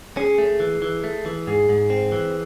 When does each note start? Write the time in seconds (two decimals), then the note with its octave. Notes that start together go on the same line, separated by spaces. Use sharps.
0.17 C#4 G#4
0.38 A3
0.60 E3
0.82 E3
1.04 A3
1.26 E3
1.47 G#2 G#4
1.69 G#2
1.90 C4
2.12 E3